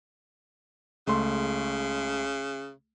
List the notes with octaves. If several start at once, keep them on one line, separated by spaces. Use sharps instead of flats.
C#2 C#3 A3 C6